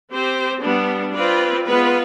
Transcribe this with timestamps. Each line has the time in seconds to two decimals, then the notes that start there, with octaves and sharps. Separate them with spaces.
0.10 C4 G4 C5
0.61 G3 B3 D4
1.13 C4 F4 B4 D5
1.65 G#3 B3 F4 B4